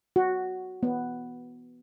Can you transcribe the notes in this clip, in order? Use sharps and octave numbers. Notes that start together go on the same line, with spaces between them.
F#4
B3